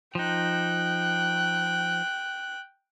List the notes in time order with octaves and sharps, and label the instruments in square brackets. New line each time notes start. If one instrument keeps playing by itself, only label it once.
[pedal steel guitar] F3 D#4 [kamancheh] G5 F#6